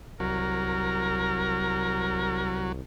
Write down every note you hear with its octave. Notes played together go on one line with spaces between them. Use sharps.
C2 F#3 A#4